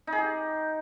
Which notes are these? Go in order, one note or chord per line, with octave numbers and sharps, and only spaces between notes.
D#4
G#4
G4